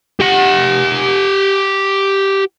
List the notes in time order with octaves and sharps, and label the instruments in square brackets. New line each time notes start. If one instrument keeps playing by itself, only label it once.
[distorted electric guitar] G4 F#5